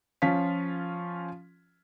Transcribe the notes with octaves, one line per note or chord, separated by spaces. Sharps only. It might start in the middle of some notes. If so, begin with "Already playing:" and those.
F3 C#4 F4 F5 B6